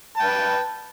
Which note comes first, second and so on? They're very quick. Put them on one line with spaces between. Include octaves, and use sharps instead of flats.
A5 G5 B4